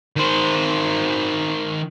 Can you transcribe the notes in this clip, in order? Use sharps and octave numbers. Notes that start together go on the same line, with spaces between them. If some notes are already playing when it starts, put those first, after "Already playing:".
D#3 C5